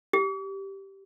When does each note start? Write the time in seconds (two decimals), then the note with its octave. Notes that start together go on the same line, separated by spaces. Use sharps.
0.13 G4